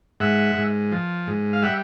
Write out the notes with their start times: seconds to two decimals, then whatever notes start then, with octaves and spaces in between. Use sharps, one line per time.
0.20 G#2 E5 F#5
0.56 G#2
0.92 F3
1.27 G#2
1.53 F5
1.63 G3 E5 F#5